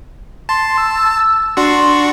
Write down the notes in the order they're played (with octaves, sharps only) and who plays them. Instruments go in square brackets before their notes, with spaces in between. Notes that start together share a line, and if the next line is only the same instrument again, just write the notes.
[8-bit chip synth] A5 [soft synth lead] C6
[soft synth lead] E6
[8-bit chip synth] D4 F#4 C#6 [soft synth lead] C6